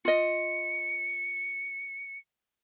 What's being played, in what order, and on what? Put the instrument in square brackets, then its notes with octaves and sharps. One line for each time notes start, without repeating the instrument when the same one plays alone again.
[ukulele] F4 D#5 [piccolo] C#7